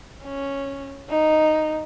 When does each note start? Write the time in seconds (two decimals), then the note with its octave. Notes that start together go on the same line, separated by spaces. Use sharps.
0.25 C#4
1.10 D#4